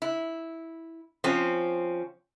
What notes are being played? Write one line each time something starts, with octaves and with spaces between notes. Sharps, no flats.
E4
F3 C4 C#4